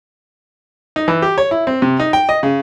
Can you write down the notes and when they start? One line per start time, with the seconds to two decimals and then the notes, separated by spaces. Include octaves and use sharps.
0.96 D#4
1.08 E3
1.22 G4
1.38 C#5
1.51 E4
1.67 C4
1.82 C3
2.00 D#4
2.13 G5
2.29 D#5
2.43 C#3